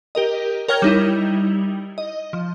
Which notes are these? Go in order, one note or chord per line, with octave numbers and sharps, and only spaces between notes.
G4 A#4 D#5
A#4 C#5 G5 F6 G#6 G7
G3 D#4 E4
D#5
F3